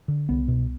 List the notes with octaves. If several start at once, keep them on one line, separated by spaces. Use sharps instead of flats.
D3
C2 B3
B2